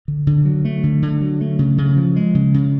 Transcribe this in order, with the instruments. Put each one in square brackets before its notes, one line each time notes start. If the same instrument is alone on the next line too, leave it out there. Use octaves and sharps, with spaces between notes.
[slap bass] D3
D3
F#3
A3
D3
D3
F#3
A3
C#3
C#3
F3
G#3
C#3
C#3